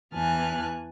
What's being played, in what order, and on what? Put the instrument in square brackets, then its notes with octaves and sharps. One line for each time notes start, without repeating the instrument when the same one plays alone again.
[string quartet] E2 E3 G#5 A5 F6 F#6